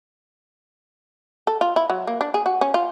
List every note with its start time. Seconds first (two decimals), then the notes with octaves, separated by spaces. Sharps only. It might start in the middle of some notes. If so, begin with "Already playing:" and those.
1.47 A4
1.61 F4
1.76 E4
1.90 F#3
2.07 A#3
2.21 D4
2.34 G#4
2.46 F#4
2.61 C#4
2.74 F4